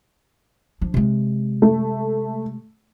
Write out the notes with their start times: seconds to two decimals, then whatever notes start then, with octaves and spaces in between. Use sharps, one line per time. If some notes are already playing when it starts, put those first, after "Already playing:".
0.81 F3 D4
0.94 C3 G#3
1.62 A3